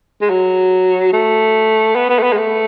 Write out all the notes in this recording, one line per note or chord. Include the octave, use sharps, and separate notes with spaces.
G#3
F#3
A3
B3
B3
A3
B3
G#3
A3